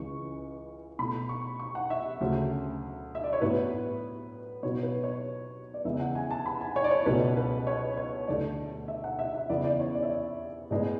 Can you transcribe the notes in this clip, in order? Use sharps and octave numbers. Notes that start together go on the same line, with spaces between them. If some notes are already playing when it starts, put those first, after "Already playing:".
Already playing: C#2 C#3 E3 C#6
B2 A3 B5
C#6
C#6
F#5
E5
D2 C#3 F#3 A3
E5
D5
C#5
A2 F#3 B3 B4
B2 F#3 B3 C#5
B4
C#5
D5
E2 C#3 E3 G#3 B3 E5
F#5
G#5
A5
B5
G#5
C#5
D5
C#5
C#2 B2 F#3 A3 B4
B4
C#5
C#5
D2 D3 A3 D5
E5
F#5
E5
E5
E2 C#3 E3 B3 D5
D5
C#5
D5
E5
D5
A2 G#3 B3 D5